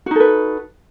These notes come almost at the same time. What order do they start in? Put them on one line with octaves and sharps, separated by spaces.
F#4 D#4 A4 B4